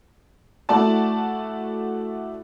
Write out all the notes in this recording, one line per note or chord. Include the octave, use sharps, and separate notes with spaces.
A3 E4 F#4 D5 A5